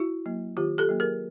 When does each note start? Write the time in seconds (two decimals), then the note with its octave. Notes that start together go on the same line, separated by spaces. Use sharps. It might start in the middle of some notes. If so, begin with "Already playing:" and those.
Already playing: E4 F#4
0.26 F#3 A#3
0.57 D#3 F4 G4
0.78 G4 A4
0.89 F#3 A#3
1.00 G#4 A#4